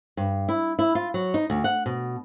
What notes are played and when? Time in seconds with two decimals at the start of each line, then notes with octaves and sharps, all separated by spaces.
0.17 G2
0.49 E4
0.79 E4
0.95 F4
1.14 F#3
1.34 D#4
1.50 D2
1.64 F#5
1.86 B2